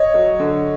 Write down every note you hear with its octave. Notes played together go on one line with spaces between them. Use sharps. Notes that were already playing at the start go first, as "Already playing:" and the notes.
Already playing: C#5 D#5
F#3
D3